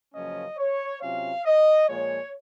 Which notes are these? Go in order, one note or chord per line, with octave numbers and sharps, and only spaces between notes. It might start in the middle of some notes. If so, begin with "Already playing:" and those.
F#2 C#3 F3 A#3 C#4 D#5
C#5
C3 F#3 C#4 F4 F5
D#5
A#2 F3 G#3 C#5